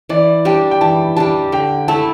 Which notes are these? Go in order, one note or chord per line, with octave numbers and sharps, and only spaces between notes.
E3 D5
G3 D4 G4 G5
G5
E3 A5
G3 D4 G4 A5
D3 G5
A3 E4 A5